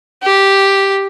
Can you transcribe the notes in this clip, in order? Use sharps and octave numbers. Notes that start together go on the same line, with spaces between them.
G4